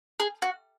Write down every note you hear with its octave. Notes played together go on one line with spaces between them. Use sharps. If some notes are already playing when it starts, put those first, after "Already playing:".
G#4
F#4